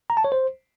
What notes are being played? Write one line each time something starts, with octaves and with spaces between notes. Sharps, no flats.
A#5
A5
C#5
C5